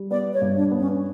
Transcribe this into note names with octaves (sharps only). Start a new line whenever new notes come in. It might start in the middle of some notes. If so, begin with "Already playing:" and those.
Already playing: G3
B3 D5
C#5
G2
D4
B3
C#4